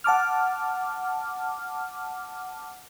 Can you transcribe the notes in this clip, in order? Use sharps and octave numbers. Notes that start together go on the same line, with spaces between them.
F#5 A5 D6 F6